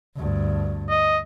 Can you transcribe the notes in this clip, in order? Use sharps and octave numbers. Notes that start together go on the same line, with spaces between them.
D2 G2
D#5